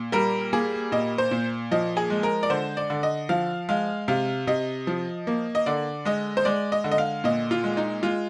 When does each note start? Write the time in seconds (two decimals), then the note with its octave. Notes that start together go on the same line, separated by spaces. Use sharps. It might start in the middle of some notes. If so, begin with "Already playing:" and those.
Already playing: A#2
0.12 G3 A#4
0.53 A#3 G#4
0.92 A#2 D#5
1.18 C5
1.31 A#2
1.71 F3 D#5
1.97 G#4
2.10 G#3
2.23 A#4
2.43 D5
2.50 D3 C5
2.77 D5
2.90 D3
3.03 D#5
3.29 F3 F5
3.69 G#3 F5
4.08 C3 F5
4.47 C3 D#5
4.87 F3
5.27 A#3
5.55 D#5
5.66 D3 D5
6.05 G#3 D#5
6.37 C5
6.45 G#3 D5
6.72 D#5
6.84 D3
6.92 D#5
6.98 F5
7.24 A#2 D#5
7.51 F4
7.64 G#3
7.77 D#4
8.03 G#3 F4